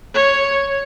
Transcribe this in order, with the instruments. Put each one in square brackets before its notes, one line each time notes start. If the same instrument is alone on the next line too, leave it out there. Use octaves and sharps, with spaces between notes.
[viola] C#5